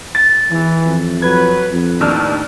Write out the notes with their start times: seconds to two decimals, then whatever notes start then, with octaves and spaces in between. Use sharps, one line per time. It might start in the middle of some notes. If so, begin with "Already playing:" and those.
0.15 A6
0.51 E2 E3
0.85 F2
1.22 F#3 B4 G#6
1.71 F2
2.01 D#2 A2 D#3 D4 E6 F6